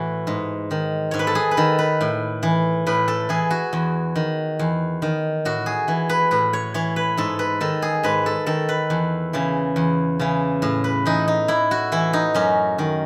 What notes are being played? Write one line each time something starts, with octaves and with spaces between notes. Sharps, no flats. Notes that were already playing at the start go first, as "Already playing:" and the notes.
Already playing: A2 E3 F#4
G#2
D#3
G#2 C#5
B4
A4
G#4
B4
D#3 A4
B4
A2
E3
A2 B4
A4
E3 G#4
F#4
E2
D#3
E2
D#3
A2 F#4
G#4
E3
B4
A2 B4
C#5
E3 C#5
B4
G#2 A4
B4
D#3 A4
G#4
G#2 B4
A4
D#3 A4
B4
E2
C#3 E3
E2
C#3 E3
A2
B4
E3 D#4
D#4
A2 E4
F#4
E3 E4
D#4
F#2 C#4
D#3